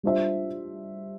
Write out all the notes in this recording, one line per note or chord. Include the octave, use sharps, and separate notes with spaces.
G3 D4 F4 C5 E5